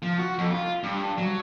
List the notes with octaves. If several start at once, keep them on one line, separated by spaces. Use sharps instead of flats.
F3
F#4
F2
F4
G2
F#3